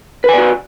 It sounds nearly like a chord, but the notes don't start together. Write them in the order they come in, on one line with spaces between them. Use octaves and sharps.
B4 G#5 D5 F#4